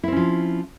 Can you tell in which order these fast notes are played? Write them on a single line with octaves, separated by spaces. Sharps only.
E4 C4 C#4 F3